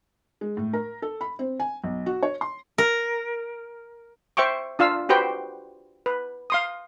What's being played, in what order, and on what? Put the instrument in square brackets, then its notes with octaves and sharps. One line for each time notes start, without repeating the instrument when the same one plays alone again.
[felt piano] G#3
A2
A#4
A4
B5
C4
G#5
B1
F#4
C#5
C6
[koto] A#4
[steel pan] C5 E5 G5 C#6 D6
D4 F4 F5 E6
F#4 G4 B4 C5 G5
B4
F5 C6 D#6